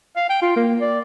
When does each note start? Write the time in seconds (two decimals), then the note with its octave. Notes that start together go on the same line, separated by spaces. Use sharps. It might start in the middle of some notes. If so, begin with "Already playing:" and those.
0.16 F5
0.29 G5
0.42 F4
0.56 A#3
0.81 D5